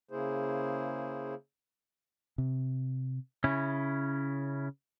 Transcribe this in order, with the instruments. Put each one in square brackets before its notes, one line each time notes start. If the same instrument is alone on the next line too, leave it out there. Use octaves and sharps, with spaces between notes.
[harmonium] C#3 A#3 E4 G#4 C5
[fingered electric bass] C3
[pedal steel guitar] C#3 C#4 E4